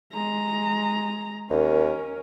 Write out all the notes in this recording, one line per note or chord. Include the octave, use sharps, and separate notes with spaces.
G#3 A#5
D#2 C#4 A#4